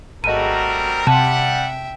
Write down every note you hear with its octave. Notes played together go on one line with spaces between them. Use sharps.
G#1 G3 A3 C4 F#4 A#4 D#5 D#7
C3 G3 E5 F#5 G5 A5